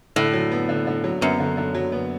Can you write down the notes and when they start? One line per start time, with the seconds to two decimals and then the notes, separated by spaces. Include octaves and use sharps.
0.16 A2 D3
0.33 F#3
0.51 B3
0.69 D3
0.87 D3
1.04 F#3
1.21 F#2 B3
1.40 D3
1.57 D3
1.75 F#3
1.92 B3